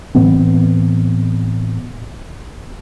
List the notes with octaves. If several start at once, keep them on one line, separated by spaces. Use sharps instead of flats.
A2 E3 B3 C4